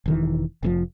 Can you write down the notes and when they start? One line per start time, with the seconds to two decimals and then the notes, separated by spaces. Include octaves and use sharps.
0.06 E1 D#3 E3
0.63 F1 B2 F3